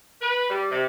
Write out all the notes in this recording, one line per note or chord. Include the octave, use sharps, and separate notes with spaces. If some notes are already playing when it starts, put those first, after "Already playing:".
B4
G3
C3